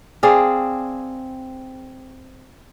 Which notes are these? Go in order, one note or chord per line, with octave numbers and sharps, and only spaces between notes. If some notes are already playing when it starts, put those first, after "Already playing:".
C4 G#4 D5 F5